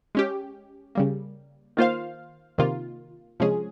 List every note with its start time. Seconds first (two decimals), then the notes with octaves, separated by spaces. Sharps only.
0.15 G#3 C#4 G4
0.95 C#3 G3 A#3
1.77 D#3 A#3 F4 C5 F5
2.58 C3 D#3 A#3 F4
3.40 C3 F3 G#3 C#4 G#4